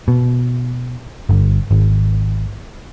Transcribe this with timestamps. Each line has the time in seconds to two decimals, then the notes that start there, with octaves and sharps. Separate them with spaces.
0.08 B2
1.29 G1
1.71 G#1